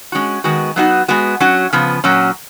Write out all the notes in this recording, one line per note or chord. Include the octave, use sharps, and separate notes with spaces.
G#3 C#4 F#4
D#3 G#3 B3 F#4
F#3 B3 D#4 F#4
G#3 B3 F#4
F#3 C#4 F#4
C#3 F3 B3
A#2 F#3 C#4 F#4